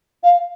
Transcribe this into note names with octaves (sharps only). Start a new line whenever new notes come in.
F5